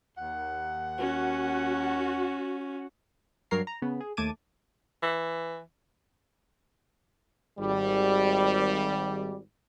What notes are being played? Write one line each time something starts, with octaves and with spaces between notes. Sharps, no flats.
D#2 F#5
C#4 F#4
G2 F#3 A#4 C#5 A#5 C7
A#5
C#3 B3
G#4
D#2 A3 A5 D6 G#6 D#7
E3
G#1 G3